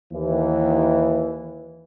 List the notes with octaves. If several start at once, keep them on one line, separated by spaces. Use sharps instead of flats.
D#2 E3